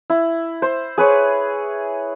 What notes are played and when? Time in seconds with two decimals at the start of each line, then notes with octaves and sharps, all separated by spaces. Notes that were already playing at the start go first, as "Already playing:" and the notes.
0.10 E4
0.62 C5
0.98 G#4 B4 C#5